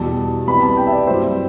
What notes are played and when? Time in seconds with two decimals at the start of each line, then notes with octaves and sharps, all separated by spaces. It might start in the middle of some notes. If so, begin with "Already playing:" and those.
Already playing: E2 B2 G3 A5
0.47 C2 C3 G3 B3 E4 B5
0.62 A5
0.77 G5
0.86 E5
0.92 D5
1.07 G2 F#3 C4 E4 C5